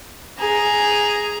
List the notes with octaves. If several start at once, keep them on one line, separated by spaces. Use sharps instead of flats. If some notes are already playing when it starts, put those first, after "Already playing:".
G#4 A#5